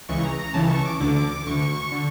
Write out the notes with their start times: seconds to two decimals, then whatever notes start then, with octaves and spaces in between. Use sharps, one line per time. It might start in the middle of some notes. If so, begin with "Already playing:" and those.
0.09 C#2 C#3 E3 C#6
0.24 A#5
0.39 A#5
0.54 C#2 C#3 E3 A5
0.69 C#6
0.85 D6
1.00 D2 D3 D6
1.16 D6
1.31 D6
1.46 D2 D3 C#6
1.92 D3